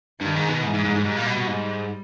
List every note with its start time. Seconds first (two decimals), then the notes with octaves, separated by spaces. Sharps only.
0.21 G2 D#3
0.36 G#2
0.49 B2
0.64 G#2 E3
0.74 G#2
0.85 G#2
0.95 G#2
1.06 G#2 G3
1.17 A#2
1.27 B2
1.37 B2
1.48 G#2